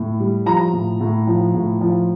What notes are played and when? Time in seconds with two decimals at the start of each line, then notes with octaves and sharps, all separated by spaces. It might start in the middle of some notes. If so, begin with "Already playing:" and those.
Already playing: A2
0.20 G3
0.46 F3 A#5
0.73 A2
1.01 A2
1.27 F3
1.55 A2
1.81 F3